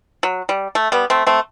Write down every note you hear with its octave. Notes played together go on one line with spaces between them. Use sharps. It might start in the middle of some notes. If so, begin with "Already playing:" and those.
F#3
G3
A3
G3 B3
A3 C4
A3 C4